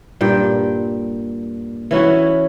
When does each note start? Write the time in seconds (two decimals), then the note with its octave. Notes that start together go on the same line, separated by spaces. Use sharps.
0.21 G2 A#2 G5
1.91 E3 C#4 E4 F#4